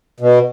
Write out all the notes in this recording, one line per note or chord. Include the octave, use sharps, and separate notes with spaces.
B2